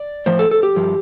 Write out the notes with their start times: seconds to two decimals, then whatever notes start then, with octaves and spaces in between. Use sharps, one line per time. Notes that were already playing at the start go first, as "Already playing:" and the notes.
Already playing: D5
0.26 A2 F3 C5
0.39 A4
0.51 A4
0.63 G4
0.76 G2 F3